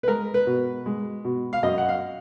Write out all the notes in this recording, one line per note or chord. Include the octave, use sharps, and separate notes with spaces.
B4
G#3 A#4
B4
B2
G#3
B2
F5
F#2 D#5
F#5
F5